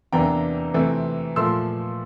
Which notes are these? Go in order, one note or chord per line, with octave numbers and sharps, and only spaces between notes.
E2 C3 E3 A#3 D4 G5 A#5
C3 E3 A3 C4
A#2 F3 A3 C6 E6